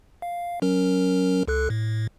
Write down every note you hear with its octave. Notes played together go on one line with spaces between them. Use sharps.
F5
F#3 C#4 A#4
C#2 A4 F#6
A2